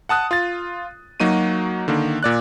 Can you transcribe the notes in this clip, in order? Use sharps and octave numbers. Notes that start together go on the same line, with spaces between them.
F#5 A5 D#6 F#6
F4 A6
F#3 A#3 D#4 F#4 D#7
D3 D#3 A#3
A#2 D5 F#6